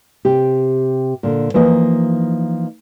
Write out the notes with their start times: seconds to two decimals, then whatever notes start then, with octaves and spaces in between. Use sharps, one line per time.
0.25 C3 G4
1.23 A#2 D3
1.54 E3 F3 A#3 D#4 D#5